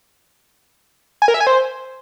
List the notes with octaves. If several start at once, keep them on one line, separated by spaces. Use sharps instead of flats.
G#5
A#4
E5
G#5
C5